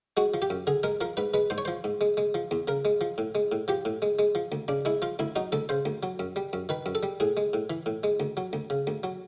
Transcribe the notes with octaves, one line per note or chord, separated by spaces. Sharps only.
G#3 F#4
F3
G4
F#2
D3 G#4
G#3 A#4
F3 A#4
G#2 B4
G#3 B4
G#2 C5
C#5
F3 C5
G#2
G#3
G#3
F3
E2
C#3 A#4
G#3
F3
A2
G#3
A2
F3 G4
A2
G#3
G#3
F3
D2
C#3 D4
G#3 E4
F3 F4
D2 E4
F#3 D#4
D2 A4
C#3 C5
D2
F#3
F#2
G3
F#2
D#3 B4
F#2
A4
G3
A2 G#4
G#3
A2
E3
A2
G#3
D2
F#3
D2
C#3
D2
F#3